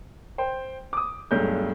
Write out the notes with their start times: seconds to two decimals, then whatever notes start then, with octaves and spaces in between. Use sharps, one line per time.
0.38 C5 G5
0.93 D6 D#6
1.31 B1 G2 F#3 G#3 A3 G6